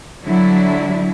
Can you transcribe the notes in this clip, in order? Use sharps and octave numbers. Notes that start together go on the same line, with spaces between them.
D3 F#3 G3 D4 E4